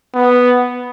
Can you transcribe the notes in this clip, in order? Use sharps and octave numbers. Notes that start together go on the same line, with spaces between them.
B3